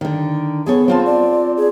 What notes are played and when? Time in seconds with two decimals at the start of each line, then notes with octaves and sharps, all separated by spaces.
0.01 D3 D#3
0.66 B3 G#4 A4 C#5
0.88 C4 F4 A5
1.06 D5
1.57 G#4